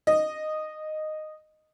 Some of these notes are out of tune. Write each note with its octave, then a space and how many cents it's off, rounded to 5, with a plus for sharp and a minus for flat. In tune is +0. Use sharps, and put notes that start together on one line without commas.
D#5 -10